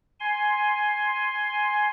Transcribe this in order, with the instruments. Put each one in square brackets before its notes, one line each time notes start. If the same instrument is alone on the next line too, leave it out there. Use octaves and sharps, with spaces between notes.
[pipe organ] G#5 C6